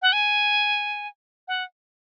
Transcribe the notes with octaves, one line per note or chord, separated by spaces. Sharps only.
F#5
G#5
F#5